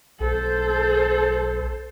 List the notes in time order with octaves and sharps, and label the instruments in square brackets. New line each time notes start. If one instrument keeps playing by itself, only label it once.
[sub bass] B1 [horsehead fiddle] A4 C5